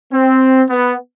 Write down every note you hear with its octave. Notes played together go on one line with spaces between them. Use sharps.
C4
B3